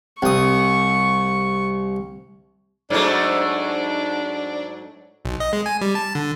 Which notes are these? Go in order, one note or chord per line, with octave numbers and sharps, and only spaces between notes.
C2 C#6 D#6
G#2 F#3 A3 D4
B1
D#5
G#3
G#5
G3
A5
D3